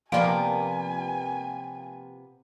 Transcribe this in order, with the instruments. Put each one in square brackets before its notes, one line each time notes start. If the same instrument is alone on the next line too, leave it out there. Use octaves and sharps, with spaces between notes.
[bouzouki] C3 B3 [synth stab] F3 A#3 [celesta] D5 D7 [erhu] G#5